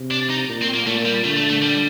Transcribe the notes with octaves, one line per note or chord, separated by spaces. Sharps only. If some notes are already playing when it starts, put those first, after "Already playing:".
Already playing: C3
D4
D#4
A#2
C4
A#3
A#2 A3
G3
D3 A3
A3
A3
G3